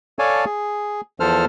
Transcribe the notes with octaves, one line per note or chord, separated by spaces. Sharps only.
A4 C#5 D5 F5 G#5 A5
G#4
E2 F3 A4 C5 F6